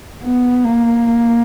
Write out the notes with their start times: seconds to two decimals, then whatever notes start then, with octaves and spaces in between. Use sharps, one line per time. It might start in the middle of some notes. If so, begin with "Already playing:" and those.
0.23 B3
0.65 A#3